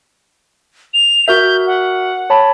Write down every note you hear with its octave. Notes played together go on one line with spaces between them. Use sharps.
F7
F#4 A#4 E5 G6
F#5
C#5 A5 B5